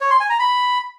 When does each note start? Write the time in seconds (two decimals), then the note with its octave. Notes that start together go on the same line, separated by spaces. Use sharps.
0.01 C#5
0.10 C6
0.20 G#5
0.30 A#5
0.39 B5